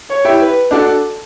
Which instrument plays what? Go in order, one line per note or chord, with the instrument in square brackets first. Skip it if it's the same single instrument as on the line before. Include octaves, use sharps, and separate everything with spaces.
[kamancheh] C#5
[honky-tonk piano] E4 G4
[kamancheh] B4
[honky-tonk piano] D4 F#4 [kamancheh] A4